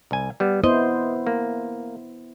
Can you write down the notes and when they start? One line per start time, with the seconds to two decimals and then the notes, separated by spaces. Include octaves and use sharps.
0.11 C2 G#5
0.40 G3 B3
0.64 B3 E4 C5 D#5
1.27 A#3